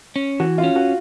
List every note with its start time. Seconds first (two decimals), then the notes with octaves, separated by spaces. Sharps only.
0.16 C#4
0.40 E3 F#4
0.58 F4
0.64 C#4
0.76 F#4